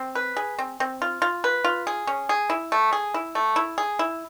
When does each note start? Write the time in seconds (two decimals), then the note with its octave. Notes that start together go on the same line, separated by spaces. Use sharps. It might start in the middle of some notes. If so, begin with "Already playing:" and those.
Already playing: C4
0.15 B4
0.37 G#4
0.59 C4
0.80 C4
1.02 F4
1.22 F4
1.44 B4
1.64 F4
1.87 G#4
2.07 C#4
2.29 G#4
2.50 E4
2.72 A3
2.93 G#4
3.14 E4
3.35 A3
3.56 E4
3.78 G#4
3.99 E4